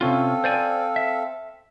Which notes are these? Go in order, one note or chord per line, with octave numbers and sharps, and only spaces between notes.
C3 C4 C#4 F4 A4 F5
C5 D5 G#5
E5